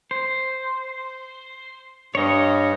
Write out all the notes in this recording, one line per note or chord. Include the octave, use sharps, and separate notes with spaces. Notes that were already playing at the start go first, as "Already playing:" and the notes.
C5
G2 C#5 D#5